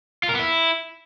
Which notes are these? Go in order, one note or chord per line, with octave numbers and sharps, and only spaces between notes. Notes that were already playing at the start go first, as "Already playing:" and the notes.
F4
A#4
B3
E4